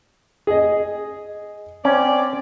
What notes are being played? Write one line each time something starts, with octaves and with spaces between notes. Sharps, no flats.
G#4 D#5
C4 C#4 D5